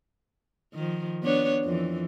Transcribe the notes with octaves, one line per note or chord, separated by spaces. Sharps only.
D#3 F3
B3 D4 C#5
F2 E3